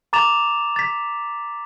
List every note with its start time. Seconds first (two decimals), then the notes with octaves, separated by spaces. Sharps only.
0.13 A#5 D6 A6 E7 F7
0.76 A6 B6